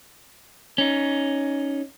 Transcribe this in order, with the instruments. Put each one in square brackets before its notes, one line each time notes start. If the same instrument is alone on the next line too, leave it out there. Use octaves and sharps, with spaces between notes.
[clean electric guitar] C#4 D#4